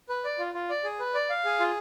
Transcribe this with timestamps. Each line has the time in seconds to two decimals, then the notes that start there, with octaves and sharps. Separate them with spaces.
0.09 B4
0.24 D5
0.39 F4
0.54 F4
0.69 D5
0.84 G#4
1.00 B4
1.14 D5
1.30 F5
1.45 G#4
1.60 F4